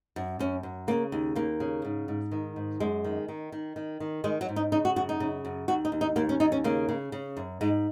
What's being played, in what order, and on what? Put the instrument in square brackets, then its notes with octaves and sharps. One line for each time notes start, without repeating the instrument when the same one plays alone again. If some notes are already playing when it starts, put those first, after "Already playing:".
[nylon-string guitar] F#2
F#2 C#4
F#2
C#3 A#3
D#2
D#2 A#3
C#3
G#2
G#2
D#3
G#2
F#2 G#3
D#3
D#3
D#3
D#3
D#3
D#3 G#3
F#3
G#2
D#4
C#3 D#4
F#4
F#2 F#4
D#4
C#3
F#2
D#2 F#4
D#4
D#2
D#4
D#2 A#3
C#4
D#2 D#4
C#4
C#3 A#3
C#3
C#3
F#2
G#2 G#3